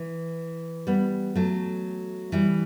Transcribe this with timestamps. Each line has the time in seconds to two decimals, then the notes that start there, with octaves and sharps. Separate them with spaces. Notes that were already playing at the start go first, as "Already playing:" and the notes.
Already playing: E3
0.87 G3 B3
1.36 F#3 A3
2.32 E3 G3